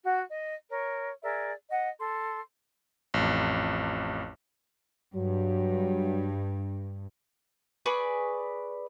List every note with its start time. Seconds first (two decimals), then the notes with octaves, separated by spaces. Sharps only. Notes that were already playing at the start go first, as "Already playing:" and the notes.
0.05 F#4 F#5
0.29 D#5
0.69 A#4 C#5
1.23 G#4 A#4 D5 E5
1.70 D#5 F#5
2.00 A4 C6
3.14 A1 F2
5.15 G2 F#3
7.86 G#4 B4 D5 C#6